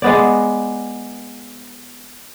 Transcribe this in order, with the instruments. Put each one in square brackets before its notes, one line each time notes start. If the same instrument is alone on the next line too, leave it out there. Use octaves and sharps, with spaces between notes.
[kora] G#3 B3 D5